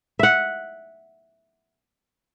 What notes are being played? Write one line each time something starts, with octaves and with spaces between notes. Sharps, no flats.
E5 F#5